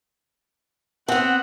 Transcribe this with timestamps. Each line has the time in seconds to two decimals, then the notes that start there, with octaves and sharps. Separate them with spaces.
1.08 B3 C4 F#5